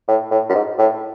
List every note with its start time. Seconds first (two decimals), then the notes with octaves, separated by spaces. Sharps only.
0.08 A2
0.31 A2
0.49 F#2
0.55 G#2
0.79 A2